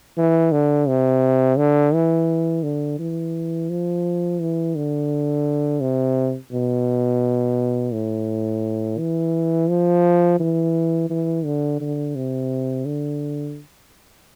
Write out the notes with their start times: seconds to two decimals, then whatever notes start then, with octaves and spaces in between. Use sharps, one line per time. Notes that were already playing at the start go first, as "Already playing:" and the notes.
0.17 E3
0.52 D3
0.88 C3
1.58 D3
1.94 E3
2.63 D3
2.99 E3
3.70 F3
4.40 E3
4.76 D3
5.81 C3
6.52 B2
7.93 A2
8.98 E3
9.69 F3
10.39 E3
11.10 E3
11.45 D3
11.80 D3
12.16 C3
12.86 D3